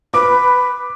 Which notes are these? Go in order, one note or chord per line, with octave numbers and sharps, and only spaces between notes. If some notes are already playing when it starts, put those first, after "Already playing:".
B4 D6